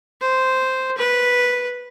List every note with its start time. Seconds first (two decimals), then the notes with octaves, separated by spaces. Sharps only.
0.21 C5
0.98 B4